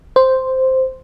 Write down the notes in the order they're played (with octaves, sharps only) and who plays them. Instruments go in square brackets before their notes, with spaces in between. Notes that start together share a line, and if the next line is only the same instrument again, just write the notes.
[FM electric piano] C5